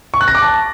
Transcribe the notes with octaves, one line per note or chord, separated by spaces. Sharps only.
C#6
F#6
A#6
D6
A5